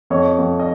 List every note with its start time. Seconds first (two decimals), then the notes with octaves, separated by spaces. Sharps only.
0.10 F2 C#5 D#5
0.39 F2
0.59 D#5